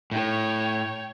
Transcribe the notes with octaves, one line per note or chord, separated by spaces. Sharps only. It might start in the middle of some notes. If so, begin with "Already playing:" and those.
A2 C#5 G5